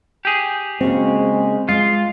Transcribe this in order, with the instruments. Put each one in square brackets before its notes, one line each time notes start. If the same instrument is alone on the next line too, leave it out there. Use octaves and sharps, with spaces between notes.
[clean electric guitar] G4 G#4
[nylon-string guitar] C#3 A#3 F#4 [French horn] G#3 [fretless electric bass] C4
[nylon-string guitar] G#3 [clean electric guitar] F4